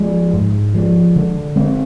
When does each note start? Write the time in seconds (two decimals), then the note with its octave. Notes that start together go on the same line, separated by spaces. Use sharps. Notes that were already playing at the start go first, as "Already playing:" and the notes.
Already playing: F3 G#3
0.33 G#2
0.74 F3 G#3
1.16 D3
1.56 G#3 C4